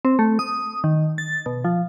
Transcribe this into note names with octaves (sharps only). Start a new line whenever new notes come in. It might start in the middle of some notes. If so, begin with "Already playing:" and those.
C4
A3
D#6
D#3
A6
B2
F3